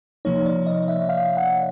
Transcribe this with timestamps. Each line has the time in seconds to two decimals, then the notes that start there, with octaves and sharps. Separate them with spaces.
0.25 C3 F3 A#3 D#4 C#5
0.46 D5
0.67 D#5
0.88 E5
1.09 F5
1.37 F#5